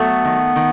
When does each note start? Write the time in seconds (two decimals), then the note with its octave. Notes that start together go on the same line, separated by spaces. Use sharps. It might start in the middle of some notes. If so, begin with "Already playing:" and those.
Already playing: F#3 A3 B3
0.25 D#3
0.56 D#3